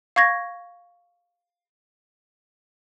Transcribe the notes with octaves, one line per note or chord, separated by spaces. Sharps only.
F5 C#6 G#6 A#6